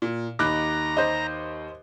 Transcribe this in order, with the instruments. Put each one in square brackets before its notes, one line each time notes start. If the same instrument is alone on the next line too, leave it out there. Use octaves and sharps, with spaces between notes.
[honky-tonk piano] A#2
[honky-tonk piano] D#2 D#4 B5 [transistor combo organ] A#5 [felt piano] D6 F#6
[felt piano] C5 D#5